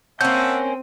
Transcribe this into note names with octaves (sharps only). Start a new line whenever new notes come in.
A#3 C4 C#4 E5 F#5 A5 G6